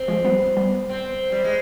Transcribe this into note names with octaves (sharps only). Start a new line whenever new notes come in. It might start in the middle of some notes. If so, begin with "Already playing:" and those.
Already playing: C4
F3 G#3
G3 B3
G3 B3
C4
G3
G#3